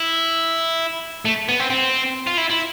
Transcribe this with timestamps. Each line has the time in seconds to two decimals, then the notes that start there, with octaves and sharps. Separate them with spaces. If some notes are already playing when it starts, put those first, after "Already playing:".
Already playing: E4
1.25 A3
1.48 B3
1.59 C4
1.70 C4
2.27 F4
2.37 E4
2.49 E4